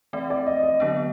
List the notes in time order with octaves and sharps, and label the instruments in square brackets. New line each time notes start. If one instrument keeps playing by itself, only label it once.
[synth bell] E3 A3 C4 [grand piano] D5
[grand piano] D5
D#5
D#5
[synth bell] D3 F#3 B3 D4